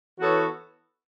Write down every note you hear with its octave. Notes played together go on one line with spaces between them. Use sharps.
E3 B3 F#4 A4 C#5